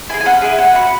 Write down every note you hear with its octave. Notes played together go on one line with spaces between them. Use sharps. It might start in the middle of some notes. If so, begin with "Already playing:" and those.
E4 G#4 G#5
G#5
C#4 F#5
E4 G#4
C#4 F#5
F#4 B5